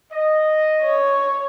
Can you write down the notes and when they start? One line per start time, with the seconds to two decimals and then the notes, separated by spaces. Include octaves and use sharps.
0.13 D#5
0.83 C#5